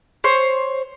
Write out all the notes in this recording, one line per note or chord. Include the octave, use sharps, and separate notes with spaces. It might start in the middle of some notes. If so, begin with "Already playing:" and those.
C5 C#5